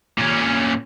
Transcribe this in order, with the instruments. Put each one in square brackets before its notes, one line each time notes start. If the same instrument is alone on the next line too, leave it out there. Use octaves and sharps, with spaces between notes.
[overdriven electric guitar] A#2 C#4